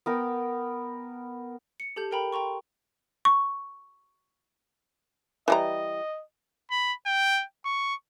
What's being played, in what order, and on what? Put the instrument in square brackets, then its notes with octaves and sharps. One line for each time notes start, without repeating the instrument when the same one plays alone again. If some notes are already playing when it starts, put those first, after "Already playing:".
[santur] B3 A#4 G5
[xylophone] C#7
G4 A4 A5 G6
A4 A#4 G5 A#5 B5
G5 A#5 C6 C#6
C#6
[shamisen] E3 G3 A#5 [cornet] D#5
[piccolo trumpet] B5
G5
C#6